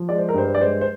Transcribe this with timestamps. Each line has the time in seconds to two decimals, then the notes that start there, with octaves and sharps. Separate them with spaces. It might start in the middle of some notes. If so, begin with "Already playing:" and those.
Already playing: F3
0.09 G#3 D5
0.18 C5
0.29 A#4
0.34 G2 C5
0.48 C5
0.55 D5
0.59 G#3 C5
0.81 C5